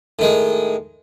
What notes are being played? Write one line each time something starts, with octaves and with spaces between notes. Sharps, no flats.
A2 D#3 G#3